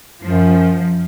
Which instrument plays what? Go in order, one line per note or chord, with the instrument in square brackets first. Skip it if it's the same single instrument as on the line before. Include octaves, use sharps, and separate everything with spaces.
[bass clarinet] F#2 [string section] F3